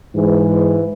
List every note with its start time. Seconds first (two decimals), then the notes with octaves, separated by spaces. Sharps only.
0.15 G#2 E3